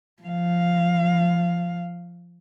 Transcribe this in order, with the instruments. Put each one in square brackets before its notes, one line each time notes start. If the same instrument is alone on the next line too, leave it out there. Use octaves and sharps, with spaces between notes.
[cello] F3 F5